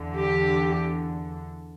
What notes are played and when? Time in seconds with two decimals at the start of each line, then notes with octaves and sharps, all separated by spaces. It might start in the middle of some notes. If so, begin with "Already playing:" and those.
Already playing: E2 D3
0.16 G4